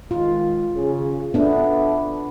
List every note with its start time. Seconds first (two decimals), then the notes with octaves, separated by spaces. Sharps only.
0.11 D#3 G#3 F4
0.75 C#3 C#4 G#4
1.34 B3 D4 A4 E5